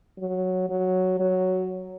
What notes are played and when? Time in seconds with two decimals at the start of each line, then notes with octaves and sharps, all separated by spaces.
0.18 F#3
0.69 F#3
1.20 F#3